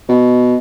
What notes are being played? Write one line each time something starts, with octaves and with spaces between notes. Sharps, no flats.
B2